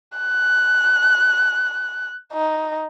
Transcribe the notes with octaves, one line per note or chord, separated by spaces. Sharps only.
F#6
D#4